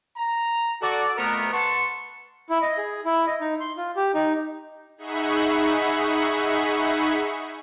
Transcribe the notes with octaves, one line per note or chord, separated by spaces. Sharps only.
A#5
F#4 A4 D5
F2 A3 B3 A#4
B4 F#5 A5 C6 C#6
E4
D#5
G#4
E4
D#5
D#4
C6
F4
G4
D#4
D#4 G#4 E5 F#5 B5 C#6